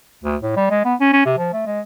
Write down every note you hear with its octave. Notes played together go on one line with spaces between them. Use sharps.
D2
A2
G3
G#3
B3
C#4
C#4
C3
F3
A3
G#3